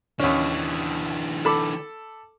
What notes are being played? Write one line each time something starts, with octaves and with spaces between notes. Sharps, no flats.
D#2 D3 E3 C#4
A4 B5 D6